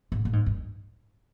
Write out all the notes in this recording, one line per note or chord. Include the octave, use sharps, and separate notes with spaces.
G#2
A2
G#2
G2